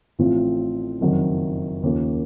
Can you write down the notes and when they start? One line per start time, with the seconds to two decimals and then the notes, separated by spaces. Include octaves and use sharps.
0.19 A1 A2 F3 C4 F4
1.01 F#1 F2 D#3 F#3
1.83 D#2 C#3 F3 A#3